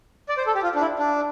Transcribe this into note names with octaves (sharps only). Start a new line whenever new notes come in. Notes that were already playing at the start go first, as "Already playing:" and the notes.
D5
C5
A4
G4
F4
D4
E4
D4